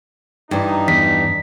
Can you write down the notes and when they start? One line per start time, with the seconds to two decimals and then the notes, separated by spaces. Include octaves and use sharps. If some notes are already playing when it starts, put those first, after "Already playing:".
0.51 G2 E3 D#4
0.88 E2 B6